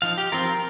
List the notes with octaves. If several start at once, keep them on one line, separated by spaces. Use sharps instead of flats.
F3 D#4 F5
G4
F3 C4 F4 A#4